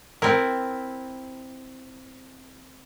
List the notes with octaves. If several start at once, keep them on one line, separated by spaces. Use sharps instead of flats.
C4 E4 A#4